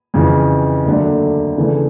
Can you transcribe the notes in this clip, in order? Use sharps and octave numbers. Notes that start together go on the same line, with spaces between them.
F2 C#3 E3
D#2 D3 F#3 A3 D4
C#3 E3 A3 D4